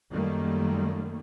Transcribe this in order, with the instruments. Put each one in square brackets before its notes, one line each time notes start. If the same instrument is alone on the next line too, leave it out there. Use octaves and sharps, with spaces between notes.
[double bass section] F#2 D#3 G3 A3 A#3